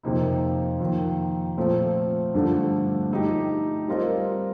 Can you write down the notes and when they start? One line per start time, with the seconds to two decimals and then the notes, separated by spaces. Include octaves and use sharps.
0.03 F2 C3 F3 A#3 D#4
0.80 F2 D#3 A#3
1.57 A#2 F3 A3 C4
2.34 G2 D3 F3 A3
3.11 A3 D#4 G4
3.88 G3 C4 F4 A#4 D#5